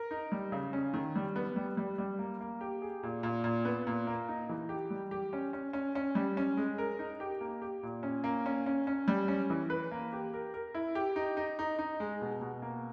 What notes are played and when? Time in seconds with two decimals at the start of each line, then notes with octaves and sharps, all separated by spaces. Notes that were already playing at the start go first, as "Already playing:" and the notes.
Already playing: A#4
0.11 D#4
0.32 G3
0.52 C#3
0.73 C#4
0.94 D#3
1.16 G3
1.36 B3
1.56 G3
1.77 G3
1.98 G3
2.19 A#3
2.41 A#3
2.61 G4
2.82 G#4
3.03 A#2
3.23 A#2
3.44 A#2
3.65 B3
3.87 A#2
4.07 A#3
4.28 D#4
4.49 E3
4.69 G4
4.90 G3
5.11 G4
5.33 C#4
5.53 C#4
5.73 C#4
5.95 C#4
6.15 G3
6.37 C#4
6.57 G#3
6.78 A#4
6.99 D#4
7.20 G4
7.41 A#3
7.62 G4
7.83 A#2
8.03 C#4
8.24 A#3
8.46 C#4
8.66 C#4
8.87 C#4
9.08 G3
9.28 C#4
9.50 E3
9.70 B4
9.91 A#3
10.13 G4
10.34 A#4
10.54 A#4
10.74 E4
10.95 G4
11.16 D#4
11.37 D#4
11.59 D#4
11.79 D#4
12.00 G#3
12.21 B2
12.41 B2
12.62 A#3